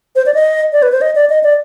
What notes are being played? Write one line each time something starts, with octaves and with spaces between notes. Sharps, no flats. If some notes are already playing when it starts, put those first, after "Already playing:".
C5
D5
D#5
D5
B4
C5
D#5
D5
D#5
D5